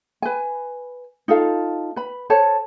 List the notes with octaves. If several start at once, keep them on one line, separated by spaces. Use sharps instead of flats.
B4 G#5
D#4 F4 A4 F5
B4 B5
A4 C5 C#5 A5